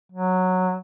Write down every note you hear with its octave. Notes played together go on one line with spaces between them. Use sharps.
F#3